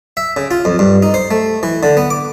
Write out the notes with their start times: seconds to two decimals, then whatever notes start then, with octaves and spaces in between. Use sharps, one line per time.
0.17 E5
0.37 C#3
0.51 F4
0.65 F2
0.79 G2
1.03 D#4
1.14 C5
1.31 A3
1.63 E3
1.83 D3
1.97 B3
2.10 D6